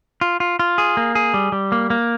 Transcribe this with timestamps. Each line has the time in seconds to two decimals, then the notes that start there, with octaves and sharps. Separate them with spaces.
0.21 F4
0.40 F4
0.59 F4
0.78 G#4
0.97 A#3
1.15 G#4
1.34 G3
1.52 G3
1.72 A#3
1.90 A#3